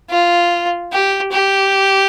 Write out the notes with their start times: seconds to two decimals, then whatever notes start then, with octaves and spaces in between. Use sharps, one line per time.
0.10 F4
0.92 G4
1.32 G4